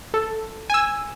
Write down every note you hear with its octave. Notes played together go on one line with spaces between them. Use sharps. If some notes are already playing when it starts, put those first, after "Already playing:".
A4
G#5 E6